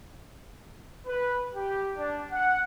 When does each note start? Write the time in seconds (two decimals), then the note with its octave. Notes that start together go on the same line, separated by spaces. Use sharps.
1.07 B4
1.56 G4
1.97 D4
2.32 F#5